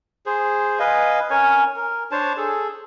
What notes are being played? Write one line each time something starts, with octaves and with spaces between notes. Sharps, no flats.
G#4 C5
B4 D#5 F5 G#5
C#4 A#4 C#5 G#5
A#4
D4 C5 C#5 A5
G#4 A4